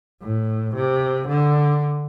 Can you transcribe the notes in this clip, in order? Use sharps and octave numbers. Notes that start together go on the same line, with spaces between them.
A2
C3
D3